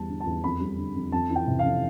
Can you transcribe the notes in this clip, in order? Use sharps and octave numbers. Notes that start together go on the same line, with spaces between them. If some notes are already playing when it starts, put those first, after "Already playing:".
Already playing: E2 G3 A5
D3
A5
E2
F2 B5
G3
D3
F2
F2 A5
E3
G5
C3
F5
F2